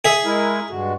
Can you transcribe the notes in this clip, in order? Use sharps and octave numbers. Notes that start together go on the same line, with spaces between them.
G#4 E5
G#3 E4 A#4
G2 G#3 F#4